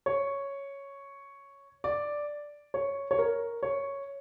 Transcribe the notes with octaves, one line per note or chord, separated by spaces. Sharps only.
C#5
D5
C#5
C#5
A#4
C#5